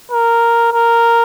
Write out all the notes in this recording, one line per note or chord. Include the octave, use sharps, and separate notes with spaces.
A#4
A#4